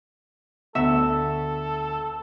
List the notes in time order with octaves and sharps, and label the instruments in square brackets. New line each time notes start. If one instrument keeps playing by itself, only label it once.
[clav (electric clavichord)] D2 F#4 [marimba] B3 [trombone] A4 [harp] E5